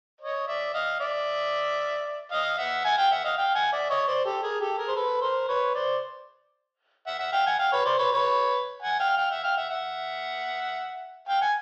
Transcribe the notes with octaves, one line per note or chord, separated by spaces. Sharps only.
C#5 D#5
D5 E5
D#5 F5
D5 E5
D#5 F5
E5 F#5
F#5 G#5
F5 G5
E5 F#5
D#5 F5
F5 G5
F#5 G#5
D5 E5
C#5 D#5
C5 D5
G4 A4
G#4 A#4
G4 A4
G#4 A#4
C5
A4 B4
A#4 C5
B4 C#5
C5 D5
E5 F#5
E5 F#5
F5 G5
F#5 G#5
F5 G5
B4 C#5
C5 D5
B4 C#5
B4 C#5
F#5 G#5
F5 G5
F5 G5
E5 F#5
F5 G5
E5 F#5
E5 F#5
F5 G5
F#5 G#5